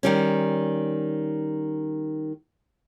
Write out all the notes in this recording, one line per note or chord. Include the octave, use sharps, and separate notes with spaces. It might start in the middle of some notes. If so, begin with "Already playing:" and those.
D#3 G3 C#4